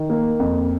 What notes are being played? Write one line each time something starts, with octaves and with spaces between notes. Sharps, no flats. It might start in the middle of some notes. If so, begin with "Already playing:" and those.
Already playing: D#3
A#3
F2